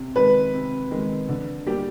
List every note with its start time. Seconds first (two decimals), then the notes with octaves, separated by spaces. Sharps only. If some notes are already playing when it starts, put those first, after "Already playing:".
Already playing: C3
0.16 D#3 G#3 B4
0.54 C3
0.91 D#3 G#3
1.29 D3
1.67 G3 A#3 D4 G4